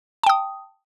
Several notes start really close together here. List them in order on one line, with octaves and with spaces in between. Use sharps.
A5 G5 D#6